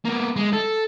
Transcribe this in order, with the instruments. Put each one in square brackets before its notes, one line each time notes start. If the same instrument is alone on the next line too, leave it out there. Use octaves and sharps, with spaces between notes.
[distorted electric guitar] A#3 B3
G#3
A4